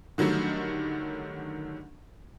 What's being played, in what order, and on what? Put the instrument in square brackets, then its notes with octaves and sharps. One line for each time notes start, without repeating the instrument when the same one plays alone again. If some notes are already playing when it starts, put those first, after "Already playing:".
[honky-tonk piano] D3 D#3 F#3 G3 A3